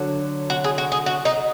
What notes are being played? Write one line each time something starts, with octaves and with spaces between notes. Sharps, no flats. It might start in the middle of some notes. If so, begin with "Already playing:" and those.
Already playing: D3 F#3
F#4
G#4
F#4
G#4
F#4
D#4